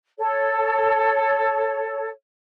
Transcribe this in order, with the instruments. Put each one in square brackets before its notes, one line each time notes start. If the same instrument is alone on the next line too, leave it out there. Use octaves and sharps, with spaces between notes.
[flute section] A4 C#5